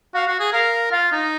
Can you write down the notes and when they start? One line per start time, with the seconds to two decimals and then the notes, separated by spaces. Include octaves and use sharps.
0.14 F#4 F5
0.27 F#4
0.39 G#4
0.53 A#4 F5
0.92 F4 F5
1.12 D#4